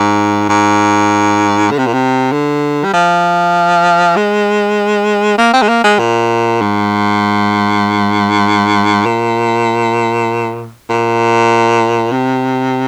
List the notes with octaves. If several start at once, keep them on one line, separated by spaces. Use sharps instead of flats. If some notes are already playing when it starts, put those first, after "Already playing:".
Already playing: G#2
G#2
D3
C3
A#2
C3
D3
G3
F3
G#3
A#3
C4
G#3
A#3
G#3
A#2
G#2
A#2
A#2
C3